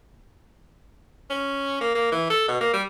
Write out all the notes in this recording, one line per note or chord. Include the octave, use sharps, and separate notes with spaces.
C#4
A#3
A#3
E3
A4
B2
A#3
G3